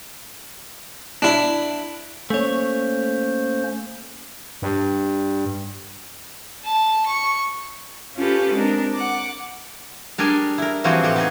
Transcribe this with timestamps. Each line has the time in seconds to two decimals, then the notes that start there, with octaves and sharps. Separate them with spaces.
1.22 D4 E4
2.30 A3 A#3 C#4 C5 C#5
4.62 G2
6.64 A5
7.06 C#6
8.16 C#4 F4 G4 A4 B4
8.53 G#3 C4 D4 A#4
8.94 F#5 D6
10.18 G3 D4 G#4 A#4 G#5
10.58 E4 A#4
10.84 E3 F3 G3 C4 F#4 G#4
11.03 A2 G3 G4 F#5
11.16 B3 D#4 G#4